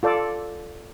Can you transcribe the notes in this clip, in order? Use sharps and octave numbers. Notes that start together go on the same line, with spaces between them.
F4 A4 D5